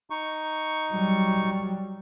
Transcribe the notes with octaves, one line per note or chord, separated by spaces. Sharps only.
D#4 C#6
F#3 G3